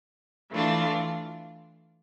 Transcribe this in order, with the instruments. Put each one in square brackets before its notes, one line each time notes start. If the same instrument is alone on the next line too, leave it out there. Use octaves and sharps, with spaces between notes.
[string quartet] E3 A3 D4 F4